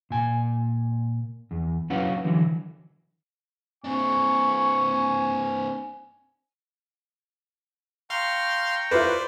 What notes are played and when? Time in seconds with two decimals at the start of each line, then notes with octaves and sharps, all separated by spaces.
0.10 A#2 G#5
1.51 E2
1.90 F#3 C#4 E4 B4 F5 F#5
2.25 D3 E3 F#3
3.84 C4 D4 G#5 C#6
8.10 F5 G5 A#5 C6 C#6 F6
8.91 E4 F4 B4 C5 D5